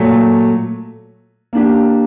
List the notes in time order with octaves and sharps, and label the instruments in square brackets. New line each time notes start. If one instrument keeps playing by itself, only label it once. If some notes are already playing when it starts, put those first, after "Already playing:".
Already playing: [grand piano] A#2 F#3 A3
A#3 D4 G4